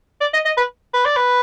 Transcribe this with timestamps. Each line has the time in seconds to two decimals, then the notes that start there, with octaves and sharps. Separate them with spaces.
0.21 D5
0.33 D#5
0.45 D#5
0.57 B4
0.94 B4
1.05 D5
1.16 B4